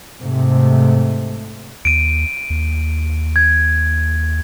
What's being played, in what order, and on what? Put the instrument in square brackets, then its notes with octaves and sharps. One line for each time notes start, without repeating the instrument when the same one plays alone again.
[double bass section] G#2 C3 A3
[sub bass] D#2 [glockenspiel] D7 D#7
[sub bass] D#2
[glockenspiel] G#6